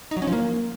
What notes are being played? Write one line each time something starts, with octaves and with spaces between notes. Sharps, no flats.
D#4
F#3
C#4
F3
A#3